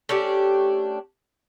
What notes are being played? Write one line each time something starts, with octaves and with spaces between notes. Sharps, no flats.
A3 C#4 D4 G4